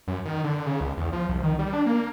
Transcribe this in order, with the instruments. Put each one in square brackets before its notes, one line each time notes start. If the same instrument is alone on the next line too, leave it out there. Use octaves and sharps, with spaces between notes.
[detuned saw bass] F#2
D#3
D3
C#3
C#2
E2
F3
C2
D#3
G3
D4
A#3